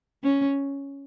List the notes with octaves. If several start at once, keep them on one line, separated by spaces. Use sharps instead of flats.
C#4